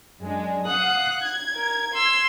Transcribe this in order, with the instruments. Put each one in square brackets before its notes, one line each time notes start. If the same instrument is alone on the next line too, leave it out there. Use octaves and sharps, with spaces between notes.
[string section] F#2 G#3 D4
[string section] F5 F#5 D#6 [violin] F#6
[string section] G#6
[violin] A#4
C6 E6